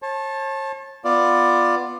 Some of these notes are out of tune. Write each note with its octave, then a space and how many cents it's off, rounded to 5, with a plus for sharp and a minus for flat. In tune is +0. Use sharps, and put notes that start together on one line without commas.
C#5 -40 A5 -5
B3 +0 F4 +0 D5 +10